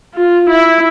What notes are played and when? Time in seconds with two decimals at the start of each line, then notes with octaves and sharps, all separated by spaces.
0.15 F4
0.50 E4